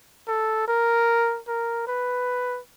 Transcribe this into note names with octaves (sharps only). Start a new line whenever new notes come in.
A4
A#4
A#4
B4